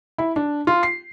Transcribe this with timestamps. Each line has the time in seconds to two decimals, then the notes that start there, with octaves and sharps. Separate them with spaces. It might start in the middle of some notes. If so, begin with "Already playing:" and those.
0.18 E4
0.36 D4
0.67 F4
0.83 C7